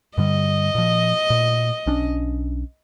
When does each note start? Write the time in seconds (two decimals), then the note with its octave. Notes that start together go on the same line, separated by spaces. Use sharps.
0.18 G2 D3 G3 D#5
0.75 A#2 F3
1.30 A#2
1.86 B1 C#4 D4